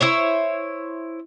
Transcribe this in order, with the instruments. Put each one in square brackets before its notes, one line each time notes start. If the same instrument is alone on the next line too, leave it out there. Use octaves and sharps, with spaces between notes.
[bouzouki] E4 C5 C#5